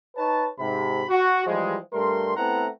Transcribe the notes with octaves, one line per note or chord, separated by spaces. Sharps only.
D#4 B4 C#5 A5
G#2 C3 B5
F#4
E3 F3 G3 G#3
G2 G3 A3 A#4 C6
A3 B3 C4 E4 F#5 A#5